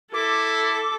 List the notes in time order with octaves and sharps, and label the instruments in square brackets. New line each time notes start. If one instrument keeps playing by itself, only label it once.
[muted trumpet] E4 [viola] A4 [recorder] D6